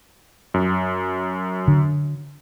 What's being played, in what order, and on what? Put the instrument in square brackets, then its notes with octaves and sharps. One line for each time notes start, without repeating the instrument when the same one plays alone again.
[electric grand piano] F#2
[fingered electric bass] D3